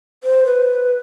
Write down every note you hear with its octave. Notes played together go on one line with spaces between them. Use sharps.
C5
B4